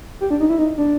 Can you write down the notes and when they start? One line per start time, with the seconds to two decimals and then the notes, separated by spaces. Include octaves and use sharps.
0.21 G4
0.30 D4
0.40 D#4
0.49 E4
0.58 D#4
0.78 D4